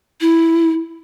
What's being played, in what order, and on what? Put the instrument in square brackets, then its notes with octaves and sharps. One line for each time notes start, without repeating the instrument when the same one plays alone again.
[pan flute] E4